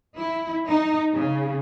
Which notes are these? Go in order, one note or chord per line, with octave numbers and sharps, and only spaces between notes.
E4
D#4
C#3